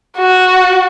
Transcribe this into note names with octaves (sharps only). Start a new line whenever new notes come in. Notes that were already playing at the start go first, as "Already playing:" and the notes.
F#4